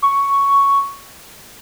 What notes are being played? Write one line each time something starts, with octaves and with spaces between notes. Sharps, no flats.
C#6